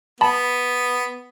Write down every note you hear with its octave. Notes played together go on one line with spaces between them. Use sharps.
B3 A5 B5